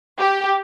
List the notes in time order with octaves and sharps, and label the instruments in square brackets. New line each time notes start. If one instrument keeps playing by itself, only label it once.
[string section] G4